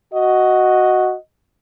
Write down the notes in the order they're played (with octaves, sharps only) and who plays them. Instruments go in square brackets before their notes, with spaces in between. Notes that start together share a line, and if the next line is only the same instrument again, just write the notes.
[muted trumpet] F#4 [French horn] D#5